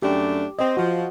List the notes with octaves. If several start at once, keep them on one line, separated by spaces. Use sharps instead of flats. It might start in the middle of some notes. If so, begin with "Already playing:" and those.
F#2 A3 D4 G4
C4 C5 D#5
F3 F#4